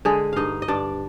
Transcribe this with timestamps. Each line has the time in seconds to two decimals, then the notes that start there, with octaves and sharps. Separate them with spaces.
0.05 D3 G#3 G#4
0.33 G2 D#4 D#5 F5
0.62 D#5
0.68 G2 D4 D5